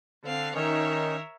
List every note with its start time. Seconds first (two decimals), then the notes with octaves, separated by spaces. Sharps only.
0.24 D3 C4 F5
0.55 D#3 C#4 D#4 A#4 C#5 E5